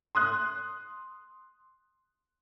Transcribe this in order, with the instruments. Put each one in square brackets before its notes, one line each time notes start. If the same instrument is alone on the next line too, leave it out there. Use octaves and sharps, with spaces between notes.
[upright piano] C6 D#6 F#6